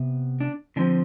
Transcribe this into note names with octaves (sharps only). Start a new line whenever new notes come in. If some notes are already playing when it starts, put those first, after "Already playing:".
Already playing: C3 B3
D4
D3 F3 C4 D4